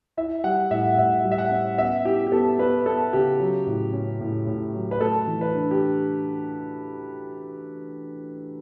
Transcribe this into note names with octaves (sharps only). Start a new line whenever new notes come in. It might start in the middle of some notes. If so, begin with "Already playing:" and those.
E4 E5
G3 F#5
A2 E5
A2 E5
G3
E5
F#5
C#4
B3 E5
E4 G4
G4
B3 A4
B3 B4
B3 A4
C#3 G4
F#3
A2
C#4
A2
A2
F#3
B4
A3 A4
E3
B4
D4
G4